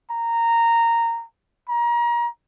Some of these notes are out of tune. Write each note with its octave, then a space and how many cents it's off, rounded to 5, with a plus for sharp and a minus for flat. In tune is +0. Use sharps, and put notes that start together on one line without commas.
A#5 -10
A#5 +30